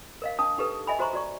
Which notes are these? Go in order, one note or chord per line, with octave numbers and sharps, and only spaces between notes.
A#4 D#5 F5
D4 A5 D#6
D#4 G4 A4 B4
D#5 E5 G#5 B5
F#4 C5 A#5 C6 C#6
F#4 D5 C#6